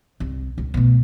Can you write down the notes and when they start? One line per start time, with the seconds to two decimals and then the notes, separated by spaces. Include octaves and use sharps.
0.20 C2
0.58 C#2
0.74 B2 A3